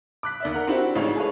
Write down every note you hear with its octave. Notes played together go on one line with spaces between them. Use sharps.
D6 F#6 B6
D#2 D5 E5
A#4 F#5
C4 D4 E4 F#4 G4 C5
A1 E3 G#3 D#4 C#5
G#4 A4 B4 C#5